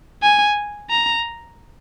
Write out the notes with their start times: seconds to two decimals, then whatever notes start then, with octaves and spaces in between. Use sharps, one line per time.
0.23 G#5
0.90 A#5